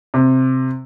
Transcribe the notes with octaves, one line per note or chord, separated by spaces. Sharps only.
C3